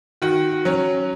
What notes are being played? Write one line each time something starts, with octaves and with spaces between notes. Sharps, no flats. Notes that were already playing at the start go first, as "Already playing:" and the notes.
D#3 F#4
F#3 C#4